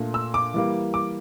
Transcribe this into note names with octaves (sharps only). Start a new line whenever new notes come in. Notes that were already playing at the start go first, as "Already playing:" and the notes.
Already playing: A#2 A3 D4
E6
D6
E3 G3 A#3
D6